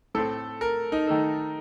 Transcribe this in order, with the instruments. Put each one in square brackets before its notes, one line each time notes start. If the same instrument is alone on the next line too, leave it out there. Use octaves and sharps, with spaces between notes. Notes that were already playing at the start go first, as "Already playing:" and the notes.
[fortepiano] A2 A3 C4 [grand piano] A4
[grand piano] A#4
D#4
[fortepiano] D#3 A3 D#4 A4